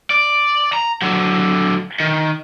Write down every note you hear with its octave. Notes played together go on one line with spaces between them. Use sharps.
D5
A#5
D3 F#3
D#3